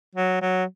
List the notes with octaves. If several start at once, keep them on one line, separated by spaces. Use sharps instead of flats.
F#3
F#3